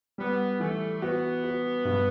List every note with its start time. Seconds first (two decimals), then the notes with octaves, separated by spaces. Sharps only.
0.18 G3 B3
0.60 E3 A3
1.02 B3 F#4
1.44 F#4
1.85 G2